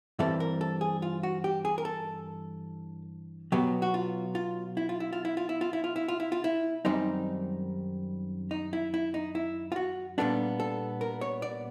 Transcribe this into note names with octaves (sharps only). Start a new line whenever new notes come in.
G2 E3 G3 C4 A4
A#4
A4
G#4
F4
F#4
G4
G#4
A#4
A4
B2 F#3 B3 G4
F#4
F4
F4
E4
F4
E4
F4
E4
F4
E4
F4
E4
F4
E4
F4
E4
F4
E4
F#2 D#3 G3 C4 D#4
D#4
E4
E4
D#4
E4
F4
F#4
A#2 G3 B3 D4 A4
A4
A#4
C#5
D5